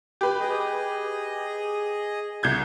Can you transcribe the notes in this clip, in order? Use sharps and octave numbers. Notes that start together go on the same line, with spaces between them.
G4 B4
G#4 D#5
C2 G6 G#6